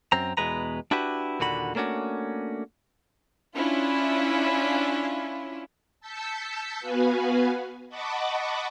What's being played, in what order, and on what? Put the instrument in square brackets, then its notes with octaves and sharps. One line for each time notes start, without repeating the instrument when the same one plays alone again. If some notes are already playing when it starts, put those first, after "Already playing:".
[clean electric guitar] F#2 C4 A#5
E2 B2 G#3 B4 A#5
D4 E4 F#4 G4 B4
D#2 A#2 D3 F#4 B5
A3 A#3 C#4 D4 F#4
[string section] C#4 D4 E4 F4
[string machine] A5 E6 G6 B6 C#7
B3 F#4 B4 F5 G#5
D#5 F#5 A5 B5 C#6 D6